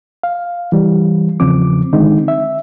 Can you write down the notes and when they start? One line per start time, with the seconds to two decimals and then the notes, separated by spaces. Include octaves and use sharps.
0.23 F5
0.72 E3 G3
1.40 E2 C#3 F3 C4 D6
1.93 D3 D#3 G#3 C4 D#4
2.28 E5